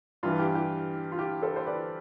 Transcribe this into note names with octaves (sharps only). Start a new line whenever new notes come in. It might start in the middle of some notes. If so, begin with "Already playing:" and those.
G2 E3 F4
G4
G4
F4
G4
A4 C5
C5
B4 D5